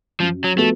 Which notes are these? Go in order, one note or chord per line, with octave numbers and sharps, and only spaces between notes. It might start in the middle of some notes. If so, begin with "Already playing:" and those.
F#2 F3
F#3
F3 A3 B3 F#4 A4